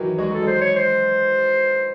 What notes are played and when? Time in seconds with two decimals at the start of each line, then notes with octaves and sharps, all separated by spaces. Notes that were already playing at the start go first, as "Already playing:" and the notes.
Already playing: D#3 E3 F#3
0.18 G#3 F#4
0.31 F#3 A4
0.43 G#3 C5
0.61 C#5
0.76 C5